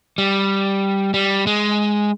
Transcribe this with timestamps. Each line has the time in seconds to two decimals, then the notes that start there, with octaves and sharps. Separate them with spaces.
0.18 G3
1.14 G3
1.47 G#3